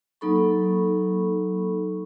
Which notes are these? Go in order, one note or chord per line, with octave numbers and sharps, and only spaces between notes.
F#3 A#3 D#4 A4 B5 C#6